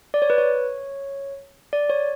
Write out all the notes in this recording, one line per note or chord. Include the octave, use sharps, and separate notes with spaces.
D5
C#5
B4
C#5
D5
C#5